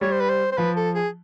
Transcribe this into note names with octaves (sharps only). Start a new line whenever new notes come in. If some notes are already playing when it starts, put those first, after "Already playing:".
G3 C#5
C5
B4
C5
C5
F3 B4
A4
G#4